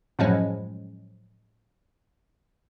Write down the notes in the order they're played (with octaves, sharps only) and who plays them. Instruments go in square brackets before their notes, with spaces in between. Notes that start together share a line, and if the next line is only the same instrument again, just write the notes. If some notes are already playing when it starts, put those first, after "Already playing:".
[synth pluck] F#2 A2 F3 F#3 G#3 C#4